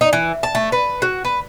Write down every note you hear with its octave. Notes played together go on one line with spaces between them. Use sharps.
D#4
E3
A5
A3
B4
F#4
B4